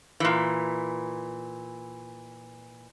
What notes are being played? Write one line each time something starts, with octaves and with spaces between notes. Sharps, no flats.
A#2 E3